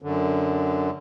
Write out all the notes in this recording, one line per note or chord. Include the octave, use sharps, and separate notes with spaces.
F#2 D3